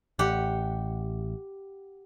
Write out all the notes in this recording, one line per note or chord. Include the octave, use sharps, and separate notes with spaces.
A1 G4 F#5